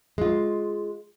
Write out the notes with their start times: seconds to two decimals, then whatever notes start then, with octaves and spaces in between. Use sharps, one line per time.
0.18 G#3 F4